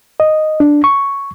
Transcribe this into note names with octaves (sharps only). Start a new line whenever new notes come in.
D#5
D4
C#6